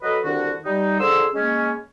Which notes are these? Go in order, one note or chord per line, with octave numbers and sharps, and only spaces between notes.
F#3 A4 B4 D#5
C2 D3 D#3 D4 F#4
G3 D#4
D3 F3 G#4 A4 C6 E6
G#3 A#3 C#4